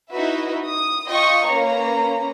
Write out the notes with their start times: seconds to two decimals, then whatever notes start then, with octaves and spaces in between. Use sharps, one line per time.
0.11 D#4 E4 F#4 B4 E5
0.65 D#6
1.08 F4 D#5 G5 C#6
1.46 A#3 C#4 B4 A#5